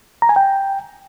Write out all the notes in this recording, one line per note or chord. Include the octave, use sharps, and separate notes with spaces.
A#5
G#5
G5